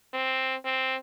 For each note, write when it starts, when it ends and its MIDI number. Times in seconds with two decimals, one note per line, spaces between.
0.14 0.56 60
0.64 0.96 60